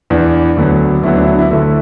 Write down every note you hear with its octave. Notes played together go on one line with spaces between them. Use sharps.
E2 E3 B3 D4
D2 D3 F#3 B3
D2 D3 F#3 B3 E4
D4
E4
D4
E4
D2 D3 A3 E4